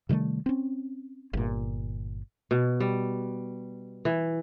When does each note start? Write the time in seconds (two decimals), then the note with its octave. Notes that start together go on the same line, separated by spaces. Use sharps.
0.09 C3 D#3 G3 A3
0.46 C4 C#4
1.33 G1 A#2
2.51 B2
2.80 G3
4.05 E3